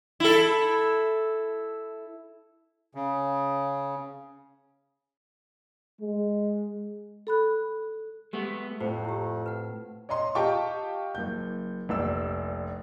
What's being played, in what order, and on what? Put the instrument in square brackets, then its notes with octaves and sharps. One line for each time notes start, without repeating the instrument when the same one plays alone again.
[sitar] E4 A4
[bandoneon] C#3
[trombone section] G#3
[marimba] A4 B5 F#6
[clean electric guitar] G#3 A3 B3 [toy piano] G4
[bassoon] F2 [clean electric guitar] A2 [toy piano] C5
[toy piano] E4 G4
B4 F#5
[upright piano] C#5 D#5 A#5 C6
F4 G4 D#5 G5 A5 C#6
F#1 G6
F1 A#1 E6